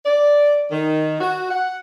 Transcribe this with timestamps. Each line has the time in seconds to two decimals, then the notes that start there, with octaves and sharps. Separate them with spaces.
0.05 D5
0.71 D#3
1.20 F#4
1.50 F#5